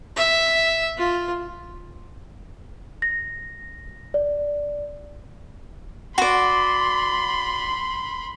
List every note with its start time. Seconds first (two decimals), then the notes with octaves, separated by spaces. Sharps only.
0.16 E5
0.97 F4
3.02 A#6
4.14 D5
6.18 F#4 D5 B5 C6